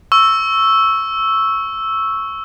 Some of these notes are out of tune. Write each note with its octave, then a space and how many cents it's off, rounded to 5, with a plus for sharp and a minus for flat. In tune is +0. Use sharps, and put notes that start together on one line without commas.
C#6 +0 E6 +0